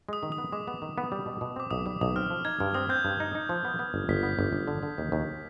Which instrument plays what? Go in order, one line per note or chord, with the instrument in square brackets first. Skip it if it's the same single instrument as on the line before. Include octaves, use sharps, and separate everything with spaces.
[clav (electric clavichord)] G#3 [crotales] D#6
[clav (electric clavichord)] D#3
[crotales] D#6
[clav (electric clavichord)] B3
[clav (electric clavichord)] G#3 [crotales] D6
[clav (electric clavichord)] B3
D#3
B3
G3
B2
B2
[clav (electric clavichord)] C4 [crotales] D6
[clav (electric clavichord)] B1 [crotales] D#6
[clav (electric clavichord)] G3 [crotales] D6
[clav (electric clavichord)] B1 [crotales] D#6
[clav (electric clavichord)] C4 [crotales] F6
[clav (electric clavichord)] F3
[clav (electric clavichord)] D#4 [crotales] G#6
[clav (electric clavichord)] G2 [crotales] F6
[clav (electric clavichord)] C4 [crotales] D#6
[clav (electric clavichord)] C4 [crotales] G6
[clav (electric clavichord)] G2
D#4
D#4
F3
B3
B3
G1
[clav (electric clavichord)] G1 [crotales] B6
[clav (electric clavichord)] B3
G1
G1
D3
D3
D#2
D#2